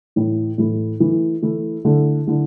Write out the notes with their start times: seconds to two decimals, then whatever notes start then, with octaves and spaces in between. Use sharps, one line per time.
0.16 A2 E3 A3 E4
0.58 A2 E3 A3 E4
1.00 E3 A3 E4
1.42 E3 A3 E4
1.85 D3 A3 E4
2.27 D3 A3 E4